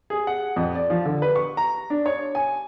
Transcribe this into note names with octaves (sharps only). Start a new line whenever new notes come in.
G#4
F#5
F2
D5
F3
D3
B4
C#6
A#5
D4
C#5
G#5